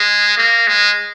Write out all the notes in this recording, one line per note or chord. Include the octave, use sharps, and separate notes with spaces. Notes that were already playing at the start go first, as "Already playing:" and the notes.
Already playing: G#3
A#3
G#3